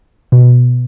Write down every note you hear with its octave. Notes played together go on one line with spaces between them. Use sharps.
B2